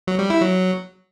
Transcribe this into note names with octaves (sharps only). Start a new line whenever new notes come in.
F#3
G3
E4
F#3